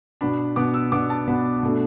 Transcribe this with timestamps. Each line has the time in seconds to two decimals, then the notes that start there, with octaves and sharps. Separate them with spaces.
0.21 B2 B3 D4 B5
0.56 B2 B3 D4 D6
0.74 E6
0.92 B2 B3 D4 D6
1.10 A5
1.28 B2 B3 D4 B5
1.63 B2 A3 D4